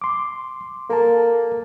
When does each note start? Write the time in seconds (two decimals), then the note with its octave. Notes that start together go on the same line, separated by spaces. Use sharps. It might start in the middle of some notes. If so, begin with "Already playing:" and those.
0.02 C6 D6
0.90 A#3 A4 A#4 A5